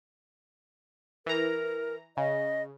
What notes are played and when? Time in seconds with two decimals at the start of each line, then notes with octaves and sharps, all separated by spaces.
1.26 E3 A#4 A#5
2.17 C#3 D#5